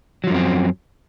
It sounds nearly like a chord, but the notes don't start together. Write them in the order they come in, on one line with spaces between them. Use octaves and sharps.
F#3 F3 F#2 C4